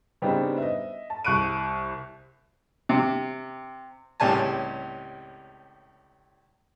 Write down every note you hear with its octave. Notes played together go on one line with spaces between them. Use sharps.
C#3 G3 B3 C4 D4 D#4
D#5 E5
A5
C2 C#6 F#6 D7 D#7
C3
C#2 A2 C3 G3 G#5 A5